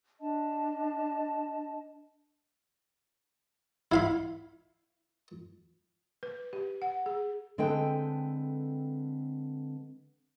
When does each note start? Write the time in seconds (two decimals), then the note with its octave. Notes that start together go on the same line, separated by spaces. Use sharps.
0.21 D4 D#5 A5
3.92 E4 F5 B5
6.23 B4
6.53 G4
6.82 F#5
7.06 G#4
7.58 D3 G#3 C4 A4 B4 G5